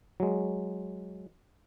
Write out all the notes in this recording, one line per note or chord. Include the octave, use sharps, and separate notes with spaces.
F#3 G#3